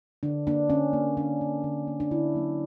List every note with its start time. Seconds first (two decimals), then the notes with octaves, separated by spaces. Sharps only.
0.23 D3 D4
0.47 A#3 D4
0.70 D3 C#4
0.93 A#3
1.17 D3 D4
1.41 A#3
1.64 D3
1.87 A#3
2.00 D4
2.11 D3 E4
2.35 F#3 A#3